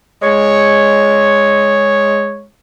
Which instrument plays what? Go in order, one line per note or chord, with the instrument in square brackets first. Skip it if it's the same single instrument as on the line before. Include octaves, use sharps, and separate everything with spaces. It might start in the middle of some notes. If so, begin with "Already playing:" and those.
[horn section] G#3 C#5